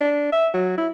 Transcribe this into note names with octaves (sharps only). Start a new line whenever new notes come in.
D4
E5
F#3
E4